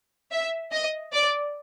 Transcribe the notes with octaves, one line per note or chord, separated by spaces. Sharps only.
E5
D#5
D5